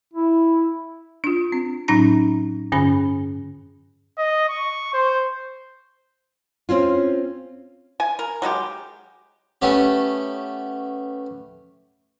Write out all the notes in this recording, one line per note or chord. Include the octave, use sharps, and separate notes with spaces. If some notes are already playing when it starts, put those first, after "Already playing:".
E4
D4 F4
C4
A2 F#3 C#4 D#4 A#5 A#6
G2 D3 C#4 G#4 B5
D#5
C#6
C5
C4 C#4 F4
G#5
A#4
F#3 G#3 F4 G4
A3 B3 C#4 G4